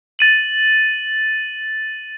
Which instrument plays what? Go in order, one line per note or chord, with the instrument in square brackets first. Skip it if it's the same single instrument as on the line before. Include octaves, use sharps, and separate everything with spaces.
[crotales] A6 D#7 F#7